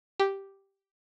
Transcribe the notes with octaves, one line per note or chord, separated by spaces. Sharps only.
G4